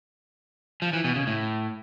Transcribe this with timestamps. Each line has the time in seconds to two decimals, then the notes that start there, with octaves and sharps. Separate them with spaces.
0.82 F3
0.93 E3
1.04 B2
1.16 C#3
1.27 A2